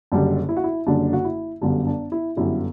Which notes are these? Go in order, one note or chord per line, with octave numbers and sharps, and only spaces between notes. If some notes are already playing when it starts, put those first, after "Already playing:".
F#1 F#2 D3 G3 D4
E4
F#4
E4
F#1 F#2 D3 G3 D4
F#4
E4
G1 F#2 D3 G3 D4
D4
E4
G1 F#2 D3 G3 E4